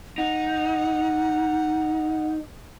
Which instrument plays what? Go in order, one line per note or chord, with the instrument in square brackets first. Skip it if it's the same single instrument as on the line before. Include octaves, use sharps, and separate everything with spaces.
[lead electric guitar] D#4 [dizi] F#5